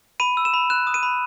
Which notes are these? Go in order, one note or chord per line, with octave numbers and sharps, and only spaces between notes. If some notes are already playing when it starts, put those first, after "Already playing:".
B5 D#7
E6
E7
B5
F#6 E7
D#6
D#7
B5